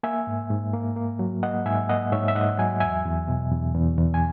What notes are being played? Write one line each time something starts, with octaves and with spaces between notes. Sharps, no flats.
A#3 E5 G#5
G#2
G#2
A#3
A#3
F#3
A#3 D#5 F#5
G#2 E5 G#5
A#3 D#5 F#5
G#2 C#5 E5
E5
G#2 D#5 F#5
F#3 G#5
E2 E5 G#5
E2
B2
E2
E2
E2
G#5